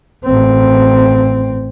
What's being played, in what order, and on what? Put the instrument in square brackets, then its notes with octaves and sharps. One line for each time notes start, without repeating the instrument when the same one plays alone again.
[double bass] A1 C4